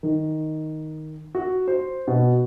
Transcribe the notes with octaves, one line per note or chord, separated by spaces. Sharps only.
D#3
F#4
C5
B2